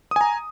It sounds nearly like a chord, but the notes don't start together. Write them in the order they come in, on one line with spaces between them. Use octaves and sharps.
D#6 G#5 A#5